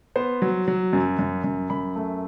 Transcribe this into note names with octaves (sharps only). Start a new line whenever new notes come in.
B3 C5
F#3
F#3
F#2
F#2
F#2
F#2 B5
A3